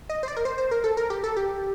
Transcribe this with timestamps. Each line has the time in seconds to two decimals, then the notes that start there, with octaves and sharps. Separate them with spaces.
0.09 D#5
0.23 C5
0.28 D5
0.37 A#4
0.45 C5
0.58 C5
0.71 A#4
0.84 A4
0.97 A#4
1.10 G4
1.24 A4
1.37 G4